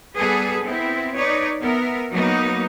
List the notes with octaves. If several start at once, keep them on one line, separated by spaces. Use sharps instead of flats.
G3 B3 G#4 A4 B4
B3 C4 E4
D#4 B4 C#5 D5
B3 A#4 E5
F#3 A#3 B3 D#4